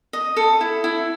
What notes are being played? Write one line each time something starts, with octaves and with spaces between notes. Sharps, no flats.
D#5
A4
E4
E4